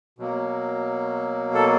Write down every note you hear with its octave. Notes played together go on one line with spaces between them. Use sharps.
B2 F#3 A#3
A4